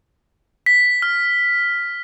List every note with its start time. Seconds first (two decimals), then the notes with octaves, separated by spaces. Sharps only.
0.66 B6
1.02 F6